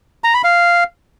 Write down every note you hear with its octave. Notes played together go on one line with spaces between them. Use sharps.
A#5
B5
F5